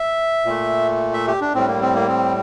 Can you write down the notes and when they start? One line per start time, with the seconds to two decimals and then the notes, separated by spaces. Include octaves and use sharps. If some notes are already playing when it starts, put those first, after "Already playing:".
Already playing: E5
0.45 A#2 A3
1.14 E5
1.28 G4
1.41 D4
1.54 A2 G3 C4
1.68 A#3
1.82 C4
1.95 A#3
2.08 C4